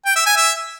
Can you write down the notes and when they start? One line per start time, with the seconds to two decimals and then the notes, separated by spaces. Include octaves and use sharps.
0.06 G5
0.16 E5
0.26 G#5
0.37 E5